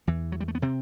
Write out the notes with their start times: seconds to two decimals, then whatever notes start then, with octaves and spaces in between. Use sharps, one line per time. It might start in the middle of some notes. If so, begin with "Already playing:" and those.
0.07 E2 E3
0.32 F#3
0.40 G3
0.48 A3
0.55 B3
0.62 C3 C4